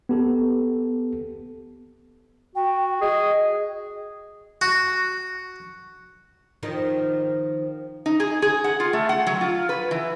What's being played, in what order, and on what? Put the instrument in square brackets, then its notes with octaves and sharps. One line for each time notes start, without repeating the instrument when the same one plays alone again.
[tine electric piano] B3 G4 A4
[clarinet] F#4 [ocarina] G5
[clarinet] G#4 [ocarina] D#5
[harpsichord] F#4
[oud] D#3 F3 D#4
[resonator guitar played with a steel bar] D#4
G#4
G#4
F#5
F4
A3
F#5
F#3
F4
B4
E3